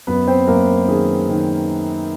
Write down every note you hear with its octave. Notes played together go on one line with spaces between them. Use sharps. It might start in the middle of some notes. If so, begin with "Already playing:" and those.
F#2 B3 B4
C4 C5
F#2 A#3 A#4
D#3 G#4
D#3